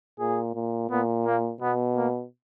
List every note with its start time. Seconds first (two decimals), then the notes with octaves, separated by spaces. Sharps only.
0.20 A#2 G#4
0.55 A#2
0.90 A#2 B3
1.26 A#3
1.61 B2 B3
1.97 A#3